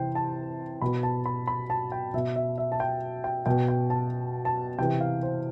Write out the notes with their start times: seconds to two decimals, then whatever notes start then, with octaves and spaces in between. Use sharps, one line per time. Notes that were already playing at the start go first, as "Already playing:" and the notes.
Already playing: C3 E3 C5 G5
0.15 A5
0.81 B2 B5
1.03 A5
1.26 B5
1.47 B5
1.70 A5
1.92 G5
2.14 B2 E5
2.36 E5
2.58 E5
2.72 A5
2.80 G5
3.24 G5
3.46 B2 G5
3.68 G5
3.90 A5
4.45 A5
4.78 C3 E3 G5
5.01 F5
5.23 C5